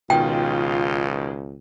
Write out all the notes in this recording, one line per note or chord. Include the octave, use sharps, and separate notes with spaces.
C#2 B2 D#3 F4 G5